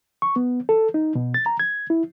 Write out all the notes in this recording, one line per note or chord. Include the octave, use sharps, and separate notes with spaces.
C#6
B3
A4
D#4
B2
A6
A#5
G#6
E4